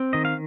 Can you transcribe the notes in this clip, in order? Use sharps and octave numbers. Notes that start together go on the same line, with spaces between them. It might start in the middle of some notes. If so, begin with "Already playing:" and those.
Already playing: C4
D#3 D#5
F5